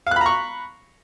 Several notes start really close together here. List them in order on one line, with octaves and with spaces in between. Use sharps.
F5 F#6 B5 A#5 C#6